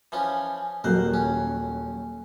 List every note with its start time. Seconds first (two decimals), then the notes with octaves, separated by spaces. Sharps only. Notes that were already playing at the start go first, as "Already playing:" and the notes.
0.12 E3 F3 C#4
0.84 D#1 F#3 A#4 C5 F#6
1.14 C#4